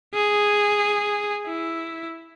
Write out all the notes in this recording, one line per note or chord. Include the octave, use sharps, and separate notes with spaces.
G#4
E4